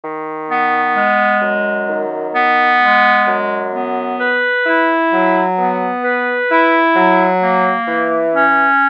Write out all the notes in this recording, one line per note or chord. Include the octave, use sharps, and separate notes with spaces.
D#3
B3
G#3
F#2
D#3
B3
G#3
F#2
B3
B4
E4
F#3
B3
B4
E4
F#3
A#3
E3
C#4